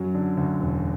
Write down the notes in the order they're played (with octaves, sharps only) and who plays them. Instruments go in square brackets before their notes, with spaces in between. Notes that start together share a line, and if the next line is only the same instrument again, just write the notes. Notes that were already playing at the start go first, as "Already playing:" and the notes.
Already playing: [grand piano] F#2 F#3
D3
D2
E1